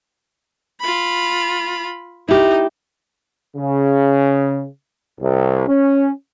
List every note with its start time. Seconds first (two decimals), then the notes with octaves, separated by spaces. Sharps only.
0.80 F4 B5
2.28 D#4 E4 G4
3.56 C#3
5.20 C2
5.67 C#4